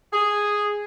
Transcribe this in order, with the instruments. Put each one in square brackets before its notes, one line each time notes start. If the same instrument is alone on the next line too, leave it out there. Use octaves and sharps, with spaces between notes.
[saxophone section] G#4